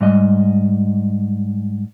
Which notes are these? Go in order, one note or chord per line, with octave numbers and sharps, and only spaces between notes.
G#2 G3 D#5